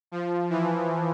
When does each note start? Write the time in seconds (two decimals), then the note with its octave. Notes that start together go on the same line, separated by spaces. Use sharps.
0.12 F3
0.50 E3